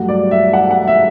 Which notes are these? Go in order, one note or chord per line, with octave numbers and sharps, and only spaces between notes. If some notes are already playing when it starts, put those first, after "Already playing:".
Already playing: G2 F#3 A3 F#5
D5
E5
F#5
F#5
E5